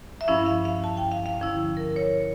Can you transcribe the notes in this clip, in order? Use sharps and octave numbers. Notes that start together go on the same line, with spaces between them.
E5
G2 F3 C#4 E4 F5
F5
F5
A5
G5
F5
F5
D3 F3 C#4 E4
A#4
C#5